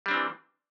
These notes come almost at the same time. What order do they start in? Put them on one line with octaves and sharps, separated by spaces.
G3 D4 C4 E3